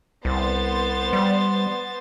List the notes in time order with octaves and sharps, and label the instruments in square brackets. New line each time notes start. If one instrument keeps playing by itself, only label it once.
[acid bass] C2 [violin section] B3 C5 A6
[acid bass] G3